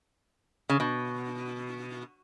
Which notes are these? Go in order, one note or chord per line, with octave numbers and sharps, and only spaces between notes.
C#3
B2